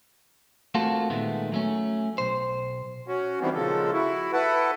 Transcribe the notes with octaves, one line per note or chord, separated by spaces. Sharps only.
A3 A#3 C4 F4 F#4 A4
A#2 D#3 G#3 A3 B3
F#3 A3 C#4
B1 C5
C#4 F#4
D#3 E3 G3 B3 C4
A#2 C#3 F3 G#3 A4
E4 F#4
E4 A4 B4 F#5